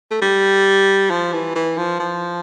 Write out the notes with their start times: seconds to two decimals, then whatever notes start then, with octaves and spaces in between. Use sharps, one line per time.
0.11 A3
0.22 G3
1.11 F3
1.33 E3
1.55 E3
1.78 F3
2.00 F3